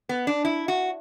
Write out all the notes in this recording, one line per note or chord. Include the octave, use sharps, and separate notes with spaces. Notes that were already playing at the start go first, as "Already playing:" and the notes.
B3
D4
E4
F#4